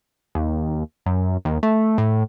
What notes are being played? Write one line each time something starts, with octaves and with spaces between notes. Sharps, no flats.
D#2
F#2
D#2
A3
A2